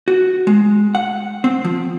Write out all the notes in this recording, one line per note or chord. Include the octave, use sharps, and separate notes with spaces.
F#4
G#3
F#5
C4
F3